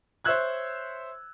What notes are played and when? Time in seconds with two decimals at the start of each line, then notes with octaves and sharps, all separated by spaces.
0.25 C5 C#5 E5 E6 F#6 G#6